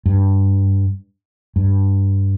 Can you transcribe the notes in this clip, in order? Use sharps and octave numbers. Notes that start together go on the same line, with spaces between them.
G2
G2